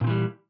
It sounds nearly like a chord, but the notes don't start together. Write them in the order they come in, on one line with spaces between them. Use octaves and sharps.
A#2 C4 E3 G3